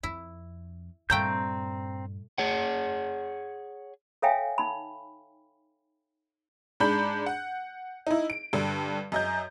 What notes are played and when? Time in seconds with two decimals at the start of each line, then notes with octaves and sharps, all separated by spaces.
0.03 F2 E4
1.10 G2 A#2 A3 C4 G5 A#5 G6
2.38 G#4 C#5 F#5
4.22 A4 C#5 E5 F5 G5 G#5
4.58 D#4 B5
6.80 G#2 D4 B5 G6
7.26 F#5
8.07 D#4 E4
8.30 D7
8.53 G2 D3
9.12 F#2 D#5 G6